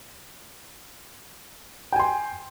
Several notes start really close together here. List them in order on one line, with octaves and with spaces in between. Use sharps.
G5 G#5 C6